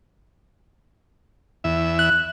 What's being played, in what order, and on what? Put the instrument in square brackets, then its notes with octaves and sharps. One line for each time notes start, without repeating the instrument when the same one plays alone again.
[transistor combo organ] E2 E5
[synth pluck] F#6